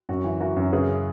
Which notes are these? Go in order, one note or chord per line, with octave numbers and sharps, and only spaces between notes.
F#2 F#4
E3
E3 F#4 A#4
F#2
C#3 G#4 B4